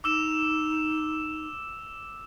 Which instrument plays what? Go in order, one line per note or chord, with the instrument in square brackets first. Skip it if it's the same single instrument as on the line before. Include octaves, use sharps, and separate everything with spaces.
[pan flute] D#4 [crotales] D6 E6 E7